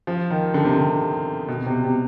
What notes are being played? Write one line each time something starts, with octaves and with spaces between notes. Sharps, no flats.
F3
D#3
D3
C3
D3
B2
C3
C3